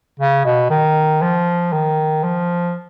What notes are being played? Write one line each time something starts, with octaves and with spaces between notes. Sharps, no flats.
C#3
B2
D#3
F3
D#3
F3